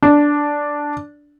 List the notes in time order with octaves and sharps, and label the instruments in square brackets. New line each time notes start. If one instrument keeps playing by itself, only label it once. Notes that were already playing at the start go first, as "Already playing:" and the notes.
[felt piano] D4